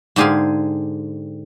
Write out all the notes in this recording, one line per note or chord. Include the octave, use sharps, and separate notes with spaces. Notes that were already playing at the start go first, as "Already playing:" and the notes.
G#2 D3 G4 G#4 F5 G#5